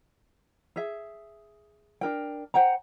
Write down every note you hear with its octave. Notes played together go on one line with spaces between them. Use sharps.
G#4 E5
D4 A#4 G5
C5 F#5 G5 A#5